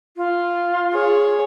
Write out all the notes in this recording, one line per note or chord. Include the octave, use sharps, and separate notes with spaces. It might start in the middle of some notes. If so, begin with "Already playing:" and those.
F4
G#4 C#5